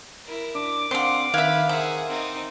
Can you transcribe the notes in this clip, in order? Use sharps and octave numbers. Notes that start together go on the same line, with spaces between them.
E4 A#4
D4 D6
C4 D4 F5 F#5 C6
D#3 B4 E5 F5 F#6 G#6
G#4 A#4 C5 E5 F#5
C4 D#4